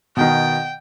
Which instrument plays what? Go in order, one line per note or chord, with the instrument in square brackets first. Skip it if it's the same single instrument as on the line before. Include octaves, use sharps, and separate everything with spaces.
[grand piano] B2 D#3 [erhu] G5